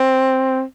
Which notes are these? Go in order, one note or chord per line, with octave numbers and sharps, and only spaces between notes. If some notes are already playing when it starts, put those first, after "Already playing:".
Already playing: C4